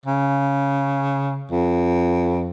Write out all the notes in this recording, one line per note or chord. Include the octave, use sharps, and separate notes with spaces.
C#3
F2